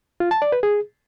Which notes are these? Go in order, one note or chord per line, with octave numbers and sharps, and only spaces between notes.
F4
A5
D5
B4
G#4